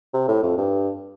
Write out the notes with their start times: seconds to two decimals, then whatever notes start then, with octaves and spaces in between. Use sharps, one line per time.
0.14 C3
0.28 A2
0.43 F2
0.58 G2